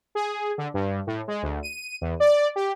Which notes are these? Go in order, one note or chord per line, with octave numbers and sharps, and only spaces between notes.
G#4
D3
G2
A2
G#3
D2
D#7
E2
D5
G4